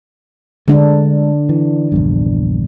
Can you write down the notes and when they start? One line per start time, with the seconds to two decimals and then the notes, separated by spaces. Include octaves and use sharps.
0.68 D3 G#3 D4
1.49 E3
1.92 A#1 E2 G2